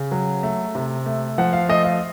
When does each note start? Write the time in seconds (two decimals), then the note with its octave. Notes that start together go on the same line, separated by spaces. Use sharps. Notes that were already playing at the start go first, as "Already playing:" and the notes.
Already playing: C#3
0.11 F#3
0.43 A3
0.75 C3
1.06 A3
1.38 F3 F#5
1.53 F5
1.69 A3 D#5
1.84 F5